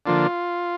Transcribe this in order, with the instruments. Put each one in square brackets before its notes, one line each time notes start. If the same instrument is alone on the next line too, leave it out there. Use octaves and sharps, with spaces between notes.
[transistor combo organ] D3 F3 A#3 D4 F4